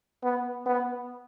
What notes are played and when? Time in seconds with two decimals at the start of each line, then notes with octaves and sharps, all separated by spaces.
0.23 B3
0.66 B3